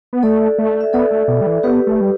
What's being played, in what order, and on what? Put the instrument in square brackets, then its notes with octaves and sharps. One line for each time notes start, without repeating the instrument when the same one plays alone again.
[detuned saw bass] B3
[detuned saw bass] A3 [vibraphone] A4 D5
[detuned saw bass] A3
[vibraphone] E5
[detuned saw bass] B3 [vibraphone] A4 D5
[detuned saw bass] A3
B2
G3
E3
[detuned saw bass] B3 [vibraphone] G4 B4
[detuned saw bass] A3
G3